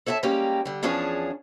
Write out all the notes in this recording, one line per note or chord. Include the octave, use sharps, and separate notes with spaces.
A4 C#5 E5 F#5 A5
G3 G#3 A#3 C#4 G4
D3 G3
E2 F3 C#4 D4 G#4 C#5